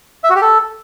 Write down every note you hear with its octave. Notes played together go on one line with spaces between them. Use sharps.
E5
F#4
G4
A4